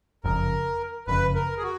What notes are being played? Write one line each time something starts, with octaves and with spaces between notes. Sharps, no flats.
F#1 F2 C#3 A#4
F#1 F2 C#3 B4
A#4
G#4
F#4